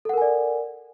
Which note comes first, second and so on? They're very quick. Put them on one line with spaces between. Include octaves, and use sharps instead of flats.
A4 F#5 A#4 G#5 D5